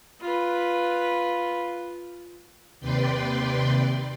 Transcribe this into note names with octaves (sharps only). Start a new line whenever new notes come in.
F4 B4
D#2 C3 B4 D5 G5 C6